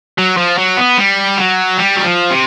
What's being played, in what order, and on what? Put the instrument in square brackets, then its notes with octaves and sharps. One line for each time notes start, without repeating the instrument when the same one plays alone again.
[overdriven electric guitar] F#3
F3
F#3
B3
G3
F#3
G3
F#3
F3
C3